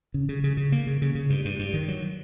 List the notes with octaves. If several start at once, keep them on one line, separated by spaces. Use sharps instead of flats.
C#3
C#3
C#3
C#3
A#3
C#3
C#3
C#3
G2
G2
G2
D#3
F#3